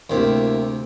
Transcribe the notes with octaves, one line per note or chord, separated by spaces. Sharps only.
D2 C3 A#3 E4 G4